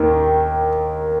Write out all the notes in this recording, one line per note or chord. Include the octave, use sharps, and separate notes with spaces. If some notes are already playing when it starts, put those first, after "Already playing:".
Already playing: D#2 D#3